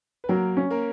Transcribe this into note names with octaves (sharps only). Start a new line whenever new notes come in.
B4
F#3 A#3 A#4
C#4
A#3 A#4